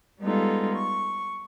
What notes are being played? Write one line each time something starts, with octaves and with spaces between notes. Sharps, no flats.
G3 G#3 B3 D#4 F4 A4
C#6